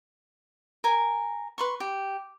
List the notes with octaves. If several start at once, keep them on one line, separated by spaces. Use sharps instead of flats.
A#4 G#5
B4 C6 C#6
G4